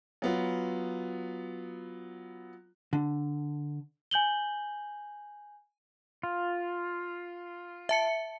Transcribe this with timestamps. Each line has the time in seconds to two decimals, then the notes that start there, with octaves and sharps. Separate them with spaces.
0.22 F#3 B3 F4
2.93 D3
4.11 G#5 G6 F#7 G7
6.23 F4
7.89 E5 A5 C#7